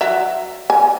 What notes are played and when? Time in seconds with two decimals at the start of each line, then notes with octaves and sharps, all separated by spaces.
0.01 F#3 E5
0.70 G#5